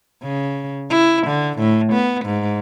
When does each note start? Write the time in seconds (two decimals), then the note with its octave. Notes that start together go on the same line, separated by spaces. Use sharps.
0.23 C#3
0.90 E4
1.27 D3
1.59 A2
1.93 B3
2.25 G#2